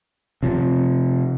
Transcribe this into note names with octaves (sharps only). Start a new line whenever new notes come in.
C3 F3